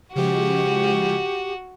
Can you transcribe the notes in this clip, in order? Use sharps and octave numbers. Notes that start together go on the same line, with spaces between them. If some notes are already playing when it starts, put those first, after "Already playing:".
C#3 F3 G#3 F#4 G4